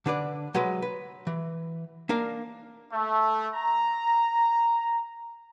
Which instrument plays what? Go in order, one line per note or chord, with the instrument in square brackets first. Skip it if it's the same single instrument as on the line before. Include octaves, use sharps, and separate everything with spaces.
[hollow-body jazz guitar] D3 D4 B4 D5
F#3 G#3 B4
B4
E3
A#3 D4 A#4 F5
[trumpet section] A3
A#5